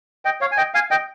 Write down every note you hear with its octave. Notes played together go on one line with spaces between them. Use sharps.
D#5 G5
C#5 F5
G#5
D#5 G5
F5 G#5
D#5 G5